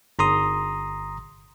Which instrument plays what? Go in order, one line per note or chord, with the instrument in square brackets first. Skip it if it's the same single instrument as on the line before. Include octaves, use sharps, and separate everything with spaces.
[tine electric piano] G1 A#5 C6 D#6